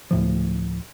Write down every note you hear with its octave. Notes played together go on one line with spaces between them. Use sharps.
D2 A2 F3